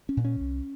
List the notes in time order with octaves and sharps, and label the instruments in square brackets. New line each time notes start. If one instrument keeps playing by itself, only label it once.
[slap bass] C#4
A#2
C#4
C2